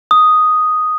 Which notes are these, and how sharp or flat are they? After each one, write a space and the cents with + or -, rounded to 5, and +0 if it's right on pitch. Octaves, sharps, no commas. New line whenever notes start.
D#6 +0